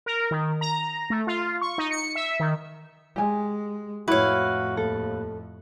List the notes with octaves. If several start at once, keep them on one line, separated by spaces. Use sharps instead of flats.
A#4
D#3
A#5
A3
F4
C#6
D#4
C#7
E5
D#3
G#3 G4 G#5
F2 A2 E4 F#4 B4 C#5 F5
D#2 A4